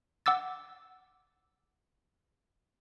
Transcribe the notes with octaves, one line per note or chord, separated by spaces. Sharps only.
F#5 D6 E6 A6